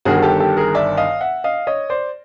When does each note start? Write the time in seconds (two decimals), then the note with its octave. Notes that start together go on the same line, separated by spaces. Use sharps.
0.05 G1 G2 D#3 F#4 G#4
0.17 G#4
0.22 G4 A4
0.40 G4 A4
0.57 G#4 A#4
0.75 D5 E5
0.97 D#5 F5
1.21 E5 F#5
1.44 D#5 F5
1.67 C#5 D#5
1.90 C5 D5